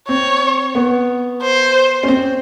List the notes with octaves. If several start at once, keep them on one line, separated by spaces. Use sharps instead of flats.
C4 C#5
B3
C5
C#4
C4